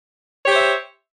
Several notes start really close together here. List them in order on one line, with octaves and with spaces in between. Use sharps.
C#5 G4 C5 E5